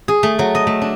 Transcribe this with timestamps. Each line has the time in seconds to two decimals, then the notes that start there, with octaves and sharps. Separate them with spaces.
0.08 G#4
0.23 A3
0.39 F#3
0.55 D#5
0.67 A3
0.82 D4